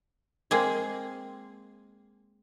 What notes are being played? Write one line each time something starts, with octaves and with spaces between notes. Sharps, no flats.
G#3 A#3 C4 G#4